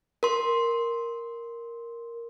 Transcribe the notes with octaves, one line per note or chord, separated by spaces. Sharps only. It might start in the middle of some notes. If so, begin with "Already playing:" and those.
A#4 C6